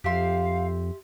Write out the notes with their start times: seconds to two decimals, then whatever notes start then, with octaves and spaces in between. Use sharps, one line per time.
0.04 F2 G4 E5 F5 C6